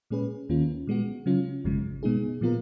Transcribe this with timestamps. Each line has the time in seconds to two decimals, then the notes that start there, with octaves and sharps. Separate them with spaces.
0.10 A#2 G#3 C#4 G#4 B4
0.49 D#2 D#3 A#3 C#4 F4
0.87 A#2 G#3 B3 F#4
1.26 C#3 F#3 C#4 F4
1.64 G#1 F#2 C#3 F3 G#3
2.03 B2 G#3 B3 D#4 G#4
2.41 A#2 F3 B3 F4 A#4